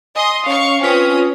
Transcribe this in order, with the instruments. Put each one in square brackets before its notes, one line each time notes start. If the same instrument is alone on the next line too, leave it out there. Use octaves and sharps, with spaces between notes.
[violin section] D#5 C6 D#6 [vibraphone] G#5
[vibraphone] C#4 C#5 [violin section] F5 C#6
[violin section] C4 C#4 D#6 [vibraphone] F4 B4 C#5